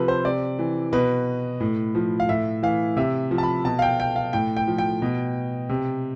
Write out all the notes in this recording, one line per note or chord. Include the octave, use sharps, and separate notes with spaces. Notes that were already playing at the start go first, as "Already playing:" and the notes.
Already playing: C3 F3 A4 B4
C5
C3 D5
E3
B2 B4
A2
F3
F5
A2 E5
E3 F5
C3 E5
F3
A5
B5
B2 A5
F5
G5
G5
F5
A2 G5
G5
F3
G5
B2
C3